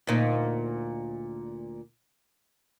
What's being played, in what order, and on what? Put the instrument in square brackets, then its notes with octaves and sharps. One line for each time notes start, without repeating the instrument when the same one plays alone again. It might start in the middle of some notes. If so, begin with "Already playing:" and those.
[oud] D2 A#2 D#4